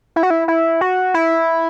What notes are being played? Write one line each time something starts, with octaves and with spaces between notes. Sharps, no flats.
E4
F#4
E4
E4
F#4
E4